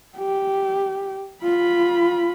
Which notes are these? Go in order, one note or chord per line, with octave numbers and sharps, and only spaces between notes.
G4
F4 B5